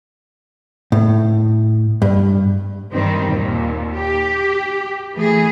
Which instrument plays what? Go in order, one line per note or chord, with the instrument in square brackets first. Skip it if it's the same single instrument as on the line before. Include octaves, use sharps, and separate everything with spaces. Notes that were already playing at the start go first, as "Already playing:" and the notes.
[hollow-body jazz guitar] A2
G2
[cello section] G2 D#3 G3 C4
D#2 A#2
G4
E3 A3 G#4